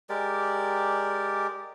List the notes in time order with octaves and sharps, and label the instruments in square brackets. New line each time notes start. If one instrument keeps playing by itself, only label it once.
[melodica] G#3 G4 A#4 D5